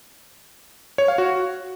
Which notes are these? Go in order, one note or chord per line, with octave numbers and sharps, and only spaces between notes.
C#5
F5
F#4